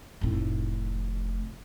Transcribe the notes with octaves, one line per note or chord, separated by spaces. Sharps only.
F1 A2